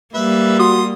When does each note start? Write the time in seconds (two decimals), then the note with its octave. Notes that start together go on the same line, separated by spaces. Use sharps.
0.14 G3 A#3 B4 E5
0.59 F#4 C6 D#6